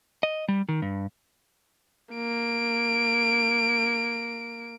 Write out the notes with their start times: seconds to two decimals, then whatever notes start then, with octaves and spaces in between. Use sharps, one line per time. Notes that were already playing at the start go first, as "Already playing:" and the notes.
0.23 D#5
0.48 G3
0.69 D#3
0.82 G2
2.15 A#3 D7